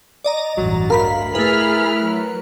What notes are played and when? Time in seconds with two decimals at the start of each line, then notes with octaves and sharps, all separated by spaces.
0.24 D5 D#5 A#5
0.58 A1 E2 G2 F#3
0.90 D2 A#4 F5 B5 B6
1.35 A3 E4 G#4 B4 B5 F6
2.04 F#3